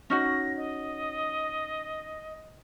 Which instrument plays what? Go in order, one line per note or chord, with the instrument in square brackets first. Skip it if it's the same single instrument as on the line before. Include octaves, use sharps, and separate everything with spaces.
[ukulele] C#4 D#4 F#4 [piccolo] A#6
[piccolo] D#5